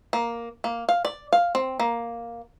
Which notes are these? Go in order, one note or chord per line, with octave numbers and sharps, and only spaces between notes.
A#3
A#3
F5
D5
F5
C4
A#3